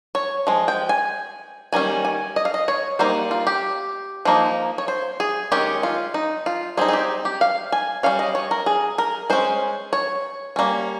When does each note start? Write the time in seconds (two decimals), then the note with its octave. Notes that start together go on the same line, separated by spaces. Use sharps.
0.15 C#5
0.47 F3 G#3
0.68 G5
0.89 G#5
1.73 D#3 G3 A#3 C#4 G#5
2.05 G#5
2.36 D#5
2.45 F5
2.54 D#5
2.68 C#5
2.99 G3 A#3 D#4 C5
3.31 F4
3.47 G4
4.25 F3 A#3 D#4
4.78 C#5
4.88 C5
5.20 G#4
5.52 D#3 G#3 C#4 G4
5.83 F4
6.14 D#4
6.46 F4
6.77 G3 C4 D#4 G#4
6.88 G#4
6.93 G4
7.25 G4
7.41 F5
7.72 G#5
8.03 G3 C#4 F5
8.19 D#5
8.35 C#5
8.51 A#4
8.66 G#4
8.98 A#4
9.30 G#3 C#4 C5
9.93 C#5
10.56 G3 A#3 C#4